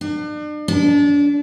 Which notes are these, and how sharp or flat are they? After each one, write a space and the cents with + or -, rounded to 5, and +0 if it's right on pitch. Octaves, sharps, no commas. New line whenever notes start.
D4 +40
D4 -30